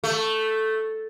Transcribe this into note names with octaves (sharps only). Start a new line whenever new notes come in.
A3